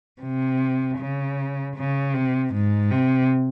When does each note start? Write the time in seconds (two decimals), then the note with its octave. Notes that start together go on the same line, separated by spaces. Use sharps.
0.21 C3
0.98 C#3
1.76 C#3
2.14 C3
2.53 G#2
2.91 C3